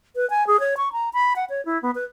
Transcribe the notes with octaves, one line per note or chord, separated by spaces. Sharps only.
B4
G#5
G#4
C#5
C#6
A#5
B5
F#5
C#5
E4
B3
B4